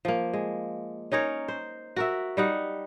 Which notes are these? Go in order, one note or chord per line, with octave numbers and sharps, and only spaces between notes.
F3 A#3
G#3
C#4 D#4 A#4 C#5
C5
F#4 A#4 E5
G3 D#4 F#5